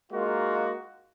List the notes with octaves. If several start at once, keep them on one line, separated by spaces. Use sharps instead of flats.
G#3 A#3 D#4 F4 F#4